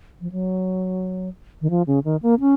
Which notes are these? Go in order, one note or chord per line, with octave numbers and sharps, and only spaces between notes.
F3
F#3
D#3
F3
C#3
D#3
A#3
C#4